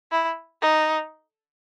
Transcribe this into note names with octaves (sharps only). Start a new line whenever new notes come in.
E4
D#4